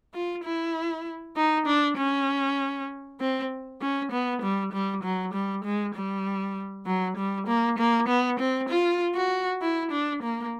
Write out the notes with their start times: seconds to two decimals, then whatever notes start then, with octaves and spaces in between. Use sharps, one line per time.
0.14 F4
0.44 E4
1.36 D#4
1.67 D4
1.98 C#4
3.20 C4
3.81 C#4
4.12 B3
4.42 G3
4.73 G3
5.04 F#3
5.34 G3
5.64 G#3
5.95 G3
6.86 F#3
7.17 G3
7.47 A#3
7.79 A#3
8.08 B3
8.40 C4
8.69 F4
9.15 F#4
9.62 E4
9.92 D4
10.23 A#3